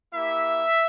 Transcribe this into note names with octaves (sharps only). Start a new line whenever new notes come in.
A#3 E4 G4 E5